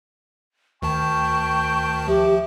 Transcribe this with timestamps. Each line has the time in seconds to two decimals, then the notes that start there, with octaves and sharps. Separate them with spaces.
0.82 D2 D#3 G5 A5 C#6
2.08 F3 G4 E5